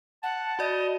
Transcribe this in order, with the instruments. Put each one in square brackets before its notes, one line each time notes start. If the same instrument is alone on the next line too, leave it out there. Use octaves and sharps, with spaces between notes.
[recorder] F#5 [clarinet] A5
[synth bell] F#4 D5 [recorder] D#5